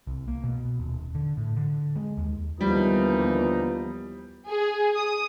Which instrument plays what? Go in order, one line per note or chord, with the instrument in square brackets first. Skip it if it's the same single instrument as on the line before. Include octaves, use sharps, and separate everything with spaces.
[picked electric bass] C2
A#3
B2
D#1
D3
A2
D3
G#3
D#2
[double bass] D#2 B3 [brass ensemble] D3 E3 D#4 [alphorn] F3 [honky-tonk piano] G3
[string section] G#4
D#6